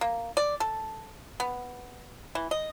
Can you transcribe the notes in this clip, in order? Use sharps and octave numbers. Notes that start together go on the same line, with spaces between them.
A#3
D5
A4
B3
E3
D#5